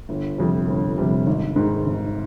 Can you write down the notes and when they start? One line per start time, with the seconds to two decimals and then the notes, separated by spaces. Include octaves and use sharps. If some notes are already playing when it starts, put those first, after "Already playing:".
0.09 G1
0.38 F2 C3 G3
0.68 G1
0.98 F2 C3 G3
1.27 G#1
1.56 G#2 D#3
1.86 G#1